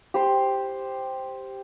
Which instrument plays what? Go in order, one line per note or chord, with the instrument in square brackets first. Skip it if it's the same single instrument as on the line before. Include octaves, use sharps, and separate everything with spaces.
[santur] G4 C5 C6